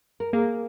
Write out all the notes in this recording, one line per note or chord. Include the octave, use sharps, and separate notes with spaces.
A#4
A#3 G#4